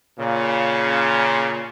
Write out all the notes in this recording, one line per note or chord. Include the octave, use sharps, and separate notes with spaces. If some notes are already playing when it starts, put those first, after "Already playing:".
A#2 C#3